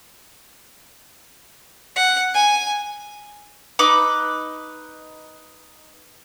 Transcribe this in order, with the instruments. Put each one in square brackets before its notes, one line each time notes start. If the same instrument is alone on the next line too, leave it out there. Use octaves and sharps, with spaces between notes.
[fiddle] F#5
G#5
[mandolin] D#4 B4 B5 D6